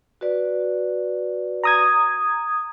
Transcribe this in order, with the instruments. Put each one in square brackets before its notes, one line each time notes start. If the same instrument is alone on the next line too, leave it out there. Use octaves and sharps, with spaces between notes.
[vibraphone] F#4 B4 D5
[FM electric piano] A#5 D#6 G#6